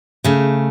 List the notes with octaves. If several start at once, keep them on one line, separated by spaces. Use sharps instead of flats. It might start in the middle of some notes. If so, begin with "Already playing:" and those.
C#3 A3